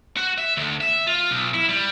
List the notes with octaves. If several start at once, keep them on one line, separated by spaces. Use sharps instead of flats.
F#4
E5
D2
E5
F4
B1
E4
G3